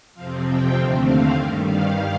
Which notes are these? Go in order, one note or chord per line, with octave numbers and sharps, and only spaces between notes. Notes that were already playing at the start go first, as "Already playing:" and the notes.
F2 C3 F3 C4 F5
G5
D#2 D3 A3 C4 F5
F5
G2 D#3 G3 A#4
F5